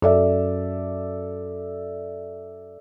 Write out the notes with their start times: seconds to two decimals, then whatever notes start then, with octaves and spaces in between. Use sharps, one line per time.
0.02 F#2 A4 D5 E5